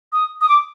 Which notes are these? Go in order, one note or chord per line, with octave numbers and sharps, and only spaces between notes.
D#6
D#6
D6